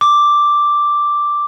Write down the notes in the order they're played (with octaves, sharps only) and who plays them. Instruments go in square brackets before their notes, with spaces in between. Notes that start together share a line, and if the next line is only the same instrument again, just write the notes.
[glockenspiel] D6